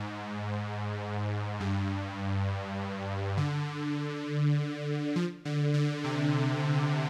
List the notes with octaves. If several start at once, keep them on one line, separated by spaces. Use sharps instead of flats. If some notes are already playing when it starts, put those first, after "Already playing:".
Already playing: G#2
G2
D3
F3
D3
D3
C3